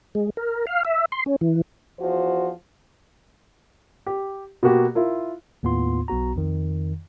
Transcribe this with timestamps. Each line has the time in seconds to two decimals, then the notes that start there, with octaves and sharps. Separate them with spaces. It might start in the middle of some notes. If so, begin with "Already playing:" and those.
0.15 G#3
0.37 A#4
0.67 F5
0.85 E5
1.12 C6
1.26 C#4
1.41 E3
2.00 E2 F3 F#4 C5
4.06 G4
4.63 B2 A#3 F#4 G4
4.95 E4 F4 A#4
5.63 D#2 A2 B3 F4 C6
6.08 B1 B3 F#4 A#5
6.36 F2 D#3